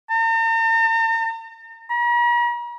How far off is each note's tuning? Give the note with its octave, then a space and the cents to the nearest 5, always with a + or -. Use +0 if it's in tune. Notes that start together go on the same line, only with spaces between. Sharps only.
A#5 -45
A#5 +45